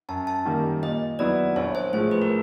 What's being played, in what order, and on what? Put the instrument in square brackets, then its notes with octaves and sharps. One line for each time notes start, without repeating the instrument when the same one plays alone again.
[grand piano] F#2 [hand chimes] A5
[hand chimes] A5
[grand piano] D#3 G3 A#3
[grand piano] A#2 [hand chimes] D#5
[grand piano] F#3 B3 E4 [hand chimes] D5
[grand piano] A#1 [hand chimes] C#5
[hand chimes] C5
[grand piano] A2 F3 G#3 [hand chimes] C5
[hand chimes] B4
A#4